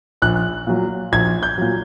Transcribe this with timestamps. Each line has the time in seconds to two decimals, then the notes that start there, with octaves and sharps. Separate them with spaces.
0.22 A#1 F#6
0.67 A#2 F#3
1.12 A#1 G#6
1.43 G6
1.58 A#2 F#3